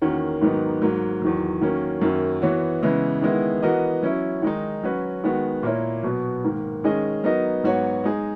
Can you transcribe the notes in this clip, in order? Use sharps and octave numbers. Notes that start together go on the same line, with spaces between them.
E2 D#3 A#3 C#4 F#4
G#2 D#3 F#3 B3 D#4
G#2 F#3 A#3
E2 D#3 F#3
D#3 F#3 A#3 C#4
F#2 D#3 F#3 A#3
E3 B3 F#4 C#5
C#3 E3 G#3 B3 E4
D#3 G#3 B3 E4
E3 B3 F#4 A#4 D#5
F#3 C#4 E4
D#3 G#3 D#4
F#3 C#4 F#4 B4
D#3 G#3 B3 F#4
A#2 A#3 E4 A#4 C#5
B2 F#3 B3
G#2 D#3 A#3
D#3 G#3 C#4 G#4 D#5
F#3 B3 D#4 A#4 D#5
G#2 F#3 B3 F#4 C#5
G#3 D#4 G#4